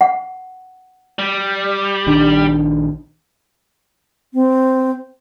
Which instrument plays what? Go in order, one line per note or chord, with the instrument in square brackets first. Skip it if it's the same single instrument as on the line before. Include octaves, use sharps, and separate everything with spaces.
[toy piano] F#5
[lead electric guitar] G3
[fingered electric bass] A#1 D#3 D4
[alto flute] C4